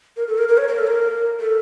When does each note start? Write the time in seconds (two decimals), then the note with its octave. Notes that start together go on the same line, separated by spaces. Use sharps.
0.17 A#4
0.28 A4
0.38 A#4
0.48 A#4
0.58 C#5
0.68 A#4
0.79 A4
0.87 A#4
1.40 A4